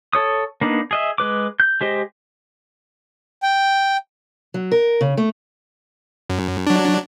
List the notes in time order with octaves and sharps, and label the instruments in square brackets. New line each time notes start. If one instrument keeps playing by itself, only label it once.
[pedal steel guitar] A4 C#5 D#6
A#3 B3 D4 D#4
G#4 D#5 E5
G#3 B4 D6
G6
G#3 G4 C5 D#5
[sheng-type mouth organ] G5
[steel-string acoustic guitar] F#3
A#4
C#3
A3
[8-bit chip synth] F#2
F#3 D4